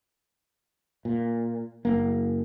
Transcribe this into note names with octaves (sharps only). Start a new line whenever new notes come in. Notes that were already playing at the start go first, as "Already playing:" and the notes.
A#2
F#1 A#3